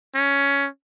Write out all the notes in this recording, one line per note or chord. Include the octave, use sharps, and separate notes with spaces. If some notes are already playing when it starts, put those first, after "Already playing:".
C#4